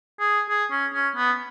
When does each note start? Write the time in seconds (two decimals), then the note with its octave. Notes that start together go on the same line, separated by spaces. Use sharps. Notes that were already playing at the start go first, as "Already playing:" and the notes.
0.20 G#4
0.49 G#4
0.71 C#4
0.94 C#4
1.16 B3